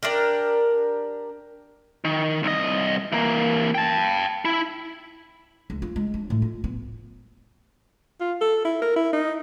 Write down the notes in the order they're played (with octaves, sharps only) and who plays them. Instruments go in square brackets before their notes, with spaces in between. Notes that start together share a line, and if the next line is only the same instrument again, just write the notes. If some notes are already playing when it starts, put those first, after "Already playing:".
[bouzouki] D4 G4 A#4
[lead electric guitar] D#3
C2 D#5
E3 A#3
G5 A5
E4
[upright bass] C#2
F4
G#3
D4
A2
F4
B3
[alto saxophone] F4
A4
E4
A#4
E4
D#4